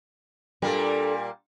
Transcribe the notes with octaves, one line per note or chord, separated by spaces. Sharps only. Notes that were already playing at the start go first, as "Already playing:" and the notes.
A#2 G3 A#3 D4 A4